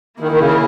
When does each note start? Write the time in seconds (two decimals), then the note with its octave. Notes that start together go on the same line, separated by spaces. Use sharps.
0.20 D#3 A#3 E4 G#4
0.32 D#3
0.40 C#3